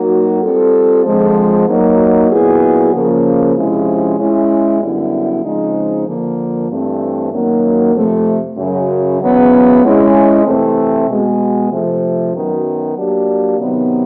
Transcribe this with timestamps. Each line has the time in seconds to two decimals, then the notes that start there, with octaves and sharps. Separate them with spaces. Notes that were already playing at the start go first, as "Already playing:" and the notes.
Already playing: F#3 A#3 D#4 F#4
0.43 G3 C4 F4 A4
1.05 F2 D3 F3 G#3
1.68 F#3 A#3 D#4
2.31 A#2 F#3 B3 E4 G#4
2.94 C#3 F3 A#3
3.56 C3 F3 G#3 C#4 E4
4.19 G#3 C#4 E4
4.82 F#2 D3 G3 B3 E4
5.44 C#3 F3 G#3 C4 D#4
6.07 D3 F3 A#3
6.70 G2 E3 A3 C4
7.32 F#2 D#3 F#3 A#3
7.95 F2 C3 F3 A3
8.57 F#2 C#3 F#3
9.21 E2 C#3 F#3 B3
9.83 G#3 C#4 E4
10.46 C3 E3 A3 C4
11.08 B2 G#3 B3
11.71 C3 F3 A3
12.34 F#2 D#3 F#3 B3
12.97 F#3 A#3 D4 G4
13.59 C3 D#3 F#3 B3